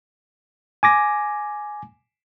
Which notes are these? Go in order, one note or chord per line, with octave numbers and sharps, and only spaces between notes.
G#5 D6 A#6